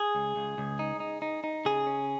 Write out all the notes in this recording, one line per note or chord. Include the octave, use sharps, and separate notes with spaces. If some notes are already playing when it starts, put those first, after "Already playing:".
Already playing: G#4
C#2
C#2
C#2
D#4
D#4
D#4
D#4
C#3 G#4
C#4